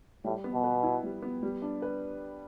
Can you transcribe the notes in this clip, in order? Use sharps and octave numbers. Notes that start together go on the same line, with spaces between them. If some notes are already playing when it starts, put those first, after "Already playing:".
A2 G3
B3
B2
B4
E4
G3
B3
G3
D4
B4